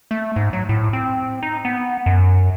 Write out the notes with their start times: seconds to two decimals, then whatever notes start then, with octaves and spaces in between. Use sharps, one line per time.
0.11 A3
0.36 G#2
0.53 F#3
0.69 A2
0.93 C4
1.43 D#4
1.65 B3
2.06 F#2